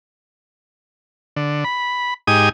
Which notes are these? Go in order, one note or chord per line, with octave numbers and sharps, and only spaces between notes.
D3
B5
G#2 D#4 G4 G#5 D#6